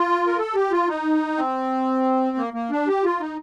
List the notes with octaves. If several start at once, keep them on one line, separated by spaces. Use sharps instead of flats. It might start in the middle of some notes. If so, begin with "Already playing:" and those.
Already playing: F4
A#4
A4
G4
F4
D#4
C4
A#3
A#3
D4
G4
F4
D#4